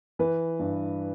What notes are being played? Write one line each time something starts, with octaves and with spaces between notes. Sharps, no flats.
E3 B4
G2